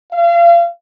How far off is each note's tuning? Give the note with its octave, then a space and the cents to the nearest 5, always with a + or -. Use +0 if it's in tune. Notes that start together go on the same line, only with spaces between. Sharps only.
F5 -35